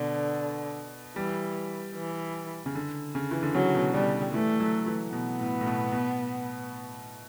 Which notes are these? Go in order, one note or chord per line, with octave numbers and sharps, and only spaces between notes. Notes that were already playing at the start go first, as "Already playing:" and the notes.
Already playing: B2 D3
E3 G3
E3
C#3
D3
C#3
E3
D3
C#3 F#3
B2
B2 G3
E3 A3
F#3
E3
B2 B3
A2
A2
B2
B2